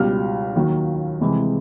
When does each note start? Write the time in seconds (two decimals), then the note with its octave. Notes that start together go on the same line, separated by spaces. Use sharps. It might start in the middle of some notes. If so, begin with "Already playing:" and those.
Already playing: C#2 B2 G3 F6
0.55 D#2 D#3 F#3
1.21 C2 C3 E3 G#3